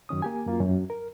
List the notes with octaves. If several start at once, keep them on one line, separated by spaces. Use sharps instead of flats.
F#2 D#3 C#4 D#6
A#3 G4 G#5
F#2 A#3 F4
F#2
A#4